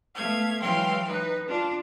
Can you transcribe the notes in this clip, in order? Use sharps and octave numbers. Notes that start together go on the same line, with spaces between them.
A3 B3 F5 G#6
E3 F#3 G#3 F5 G5 C6
D#4 B4
D4 F4